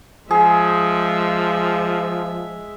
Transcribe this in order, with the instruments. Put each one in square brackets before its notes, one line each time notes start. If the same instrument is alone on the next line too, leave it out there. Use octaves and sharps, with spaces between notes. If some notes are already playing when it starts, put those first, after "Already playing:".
[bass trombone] F3 [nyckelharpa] G#3 E5 [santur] G#4